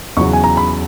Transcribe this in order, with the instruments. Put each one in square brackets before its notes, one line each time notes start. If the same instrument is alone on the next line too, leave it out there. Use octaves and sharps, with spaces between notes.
[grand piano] E2 C#3 F#3 B3 C#6
G#5
A#5
B5